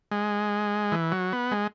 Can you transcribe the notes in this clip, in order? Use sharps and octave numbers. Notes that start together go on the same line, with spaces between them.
G#3
E3
F#3
B3
G#3